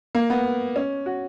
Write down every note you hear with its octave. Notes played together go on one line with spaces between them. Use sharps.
A#3
B3
C#4
F#4